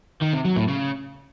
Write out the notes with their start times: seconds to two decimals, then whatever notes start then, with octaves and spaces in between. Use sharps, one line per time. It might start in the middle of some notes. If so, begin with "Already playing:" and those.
0.21 D#3
0.33 C3
0.45 F#3
0.56 A2
0.68 C#3